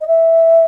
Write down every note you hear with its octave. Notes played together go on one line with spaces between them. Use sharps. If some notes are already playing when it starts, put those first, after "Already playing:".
D#5
E5